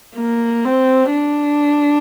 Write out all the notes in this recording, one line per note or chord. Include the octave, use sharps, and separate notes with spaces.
A#3
C4
D4